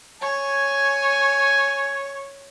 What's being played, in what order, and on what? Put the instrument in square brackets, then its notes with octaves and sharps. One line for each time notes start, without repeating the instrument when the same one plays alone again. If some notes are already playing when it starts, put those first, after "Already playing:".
[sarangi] C#5 [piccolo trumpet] G#5